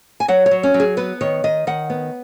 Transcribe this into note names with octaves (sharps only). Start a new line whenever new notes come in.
G#5
F#3 F#5
C#5
F#3
C#4
F#3
G#4
B3 B4
D#3 C#5
D#3 D#5
D#3 F#5
B3